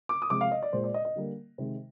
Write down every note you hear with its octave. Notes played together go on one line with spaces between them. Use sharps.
D6
D#6
C3 F3 G#3 D6
F5
D#5
D5
A#2 G#3 C5
D5
D#5
D#5
D3 G3 A#3
C3 D#3 G#3